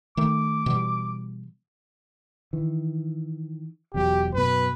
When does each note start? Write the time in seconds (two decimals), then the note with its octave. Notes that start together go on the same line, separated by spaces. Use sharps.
0.17 D#3 A3 D6
0.66 B2 E3 G3
2.53 D#3 E3
3.94 E1 E2 F#3 G4
4.34 F#2 B2 B4